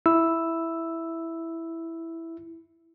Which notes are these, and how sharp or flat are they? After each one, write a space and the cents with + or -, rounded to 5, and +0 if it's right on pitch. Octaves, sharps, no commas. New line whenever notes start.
E4 +0 E6 +0